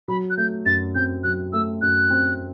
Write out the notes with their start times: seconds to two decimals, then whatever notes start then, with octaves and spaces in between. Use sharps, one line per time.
0.08 F#3 B5
0.30 F#6
0.37 A3 G6
0.66 F#2 A6
0.95 C4 G6
1.24 F#3 F#6
1.53 A3 E6
1.82 F#2 F#6
2.10 C4